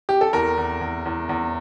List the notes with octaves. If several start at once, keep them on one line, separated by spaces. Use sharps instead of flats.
G4
A4
E2 A#4
E2
E2
E2
E2